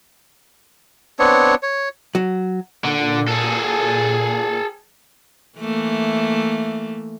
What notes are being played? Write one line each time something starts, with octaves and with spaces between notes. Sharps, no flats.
B3 C4 D4 C#5
C#5
F#3
A#2 D3
G#4 A4
E3 A3 A#3